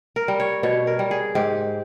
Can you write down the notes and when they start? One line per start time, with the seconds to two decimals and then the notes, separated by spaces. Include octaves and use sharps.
0.16 A#4
0.28 G3
0.40 C#5
0.63 B2 C#5
0.87 A#4
0.99 G3
1.11 G#4
1.35 G#2 G4